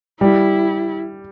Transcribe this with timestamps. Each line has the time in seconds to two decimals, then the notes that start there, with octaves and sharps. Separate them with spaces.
0.21 G3 E4